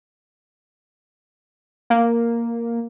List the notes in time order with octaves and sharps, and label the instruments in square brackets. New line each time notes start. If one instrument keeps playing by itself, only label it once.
[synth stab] A#3